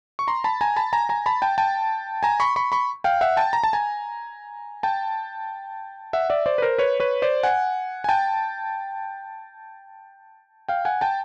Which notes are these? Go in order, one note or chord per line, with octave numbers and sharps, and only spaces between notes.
C#6
A#5 C6
A5 B5
G#5 A#5
A5 B5
G#5 A#5
G#5 A#5
A5 B5
G5 A5
G5 A5
G#5 A#5
B5 C#6
B5 C#6
B5 C#6
F5 G5
E5 F#5
G5 A5
A#5
A5
G#5 A#5
G5 A5
E5 F#5
D5 E5
C5 D5
B4
A#4 C5
B4 C#5
B4 C#5
C5 D5
F#5 G#5
G#5
G5 A5
F5 G5
F#5 G#5
G5 A5